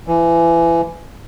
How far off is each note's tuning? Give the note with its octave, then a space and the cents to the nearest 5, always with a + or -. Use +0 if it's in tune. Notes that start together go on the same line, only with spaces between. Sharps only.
E3 +25